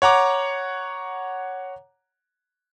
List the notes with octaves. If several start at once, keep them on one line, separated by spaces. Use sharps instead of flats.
C#5 F#5 A#5 D6